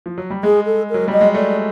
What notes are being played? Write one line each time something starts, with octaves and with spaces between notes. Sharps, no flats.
F3
F#3
G3
G#3 G#4
A4
A#4
F#3
G3 D#5
G#3
A3 D5